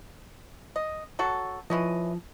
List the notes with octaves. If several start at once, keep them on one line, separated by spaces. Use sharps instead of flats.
D#5
F#3 F#4 A4
E3 F3 C#4 D#5